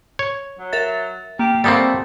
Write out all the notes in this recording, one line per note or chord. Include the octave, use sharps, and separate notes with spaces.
C#5
F#3
A#4 E5 A6
A#3 G4
G3 A3 A#3 C4 F#5 D#6 A6